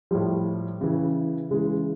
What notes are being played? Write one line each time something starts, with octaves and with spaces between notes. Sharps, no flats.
A2 F3 G3
C#3 E3
C#3 E3 G#3